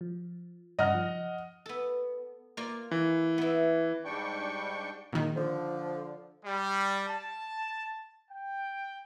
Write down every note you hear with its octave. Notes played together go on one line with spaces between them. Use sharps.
F3
G2 C#3 D#5 F#5 F6 A#6
F3
B3 A4
A#3 F4 D5
E3
B3 E4
G#2 G3 D4 G5 C#6
A#1 D#3
D3 F3
G3
A5
G5